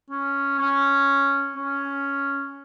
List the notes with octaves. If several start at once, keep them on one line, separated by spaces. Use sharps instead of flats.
C#4
C#4
C#4